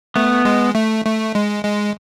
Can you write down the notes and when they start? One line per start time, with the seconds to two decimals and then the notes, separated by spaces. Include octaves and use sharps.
0.16 A3 B3
0.45 G#3
0.75 A3
1.05 A3
1.35 G#3
1.65 G#3